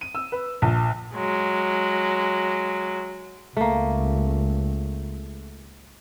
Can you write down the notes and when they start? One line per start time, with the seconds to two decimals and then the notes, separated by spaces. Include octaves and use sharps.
0.01 D#7
0.15 E6
0.32 B4
0.62 A#1
1.15 F#3 G#3
3.57 C#2 A3 A#3